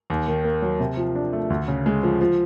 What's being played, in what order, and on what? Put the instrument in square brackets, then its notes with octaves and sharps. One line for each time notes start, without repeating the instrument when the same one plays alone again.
[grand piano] D#2
D#3
A#3
F#3
C3
F3
D4
A3
D2
C#3
G#3
F3
F3